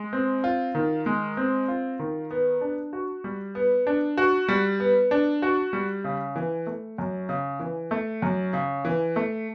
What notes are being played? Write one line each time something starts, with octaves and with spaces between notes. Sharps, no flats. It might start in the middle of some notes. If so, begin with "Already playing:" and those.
Already playing: G#3
C4
F4
D#3
G#3
C4
F4
D#3
B3
D4
F#4
G3
B3
D4
F#4
G3
B3
D4
F#4
G3
C#3
E3
A3
F#2
C#3
E3
A3
F#2
C#3
E3
A3